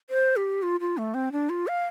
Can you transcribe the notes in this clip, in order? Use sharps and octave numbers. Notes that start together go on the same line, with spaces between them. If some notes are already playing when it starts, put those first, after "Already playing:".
C5
G4
F4
F4
A3
C4
D4
F4
F5